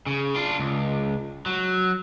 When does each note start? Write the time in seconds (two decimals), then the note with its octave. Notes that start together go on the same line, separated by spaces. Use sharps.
0.07 C#3
0.35 D4 F4
0.59 C#2
1.46 F#3